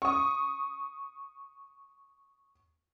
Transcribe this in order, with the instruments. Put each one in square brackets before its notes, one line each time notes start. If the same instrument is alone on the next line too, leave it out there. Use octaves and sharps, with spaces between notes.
[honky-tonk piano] C#6 D#6